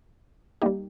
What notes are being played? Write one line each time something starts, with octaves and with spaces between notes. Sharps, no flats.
G3 A#3 D#4 G4